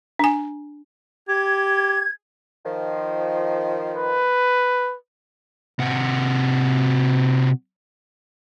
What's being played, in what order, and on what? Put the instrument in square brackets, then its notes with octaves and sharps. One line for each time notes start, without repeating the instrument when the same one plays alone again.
[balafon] D4 G#5
[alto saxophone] G4 [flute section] G#6
[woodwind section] D#3 F3
[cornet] B4
[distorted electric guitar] C3 F#4